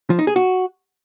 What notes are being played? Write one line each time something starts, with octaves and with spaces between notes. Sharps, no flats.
F3
D#4
G#4
F#4